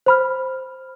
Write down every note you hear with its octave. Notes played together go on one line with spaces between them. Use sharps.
C5 B5 F6